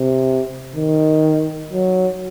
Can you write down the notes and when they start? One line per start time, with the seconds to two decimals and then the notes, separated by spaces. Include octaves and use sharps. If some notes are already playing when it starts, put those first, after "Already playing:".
Already playing: C3
0.75 D#3
1.73 F#3